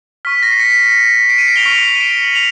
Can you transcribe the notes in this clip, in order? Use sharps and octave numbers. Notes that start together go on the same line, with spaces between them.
C#6 F6 B6
A#6
C7
B6 C#7
C7 D7
C#7 D#7
C7 D7
F7 G7
C#6 F6 C7 D7
C#7 D#7
D#7
D7 E7
F#7
D#7 F7